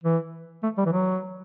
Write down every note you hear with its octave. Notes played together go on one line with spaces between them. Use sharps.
E3
A3
G3
E3
F#3